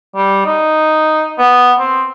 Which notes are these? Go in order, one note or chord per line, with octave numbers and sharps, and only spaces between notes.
G3
D#4
B3
C4